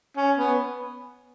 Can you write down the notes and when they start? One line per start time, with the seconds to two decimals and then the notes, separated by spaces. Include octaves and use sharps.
0.17 C#4
0.38 B3